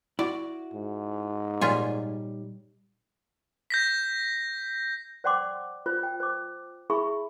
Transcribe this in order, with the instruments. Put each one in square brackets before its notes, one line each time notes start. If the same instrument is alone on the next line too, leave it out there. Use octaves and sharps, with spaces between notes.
[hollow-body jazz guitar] E4 F#4 [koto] D5
[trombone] G#2
[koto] A#2 F4 G#5 [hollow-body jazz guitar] G3 D#4 C#5
[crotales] G6 A#6 B6
[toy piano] C5 D5 F#5 G5 C6 D6
F4 C5
G5
C5 D6
E4 G#4 E5 B5 C#6